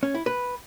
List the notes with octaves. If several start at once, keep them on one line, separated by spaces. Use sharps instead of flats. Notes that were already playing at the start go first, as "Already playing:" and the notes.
C#4
E4
B4